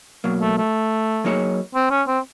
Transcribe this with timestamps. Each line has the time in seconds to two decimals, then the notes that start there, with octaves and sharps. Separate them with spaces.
0.24 B2 F#3 A#3
0.41 A3
0.57 A3
1.24 F#3 A#3 D#4 G#4 C#5
1.75 C4
1.91 C#4
2.08 C4